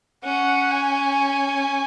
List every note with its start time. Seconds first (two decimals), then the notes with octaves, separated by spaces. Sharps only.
0.24 C#4 F#5
0.71 G#5